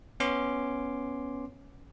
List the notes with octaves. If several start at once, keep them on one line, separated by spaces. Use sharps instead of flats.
B3 C#4 C6 D6